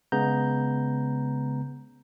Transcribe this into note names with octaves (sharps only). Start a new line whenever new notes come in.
C#3 G#3 B3 A#5 G6